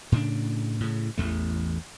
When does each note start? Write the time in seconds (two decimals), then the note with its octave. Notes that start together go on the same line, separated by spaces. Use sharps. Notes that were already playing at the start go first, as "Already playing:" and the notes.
0.12 A2 C#3 C#4 D4
0.80 A2 C#3
1.18 A1 E2 A3